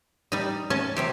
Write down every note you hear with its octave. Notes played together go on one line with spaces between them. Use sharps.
G3 D#4
C#4 D#5 A5
C3 F#3 G4